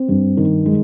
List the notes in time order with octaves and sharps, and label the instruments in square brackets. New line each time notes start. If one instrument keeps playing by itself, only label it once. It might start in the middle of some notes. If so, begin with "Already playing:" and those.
Already playing: [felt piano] C4
G2
D#3
G#3